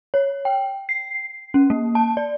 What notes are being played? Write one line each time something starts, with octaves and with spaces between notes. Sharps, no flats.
C#5
G5
C7
C#4
A#3
A5
D5